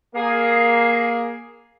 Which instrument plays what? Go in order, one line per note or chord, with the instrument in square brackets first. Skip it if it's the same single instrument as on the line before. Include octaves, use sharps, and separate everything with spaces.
[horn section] A#3 G#4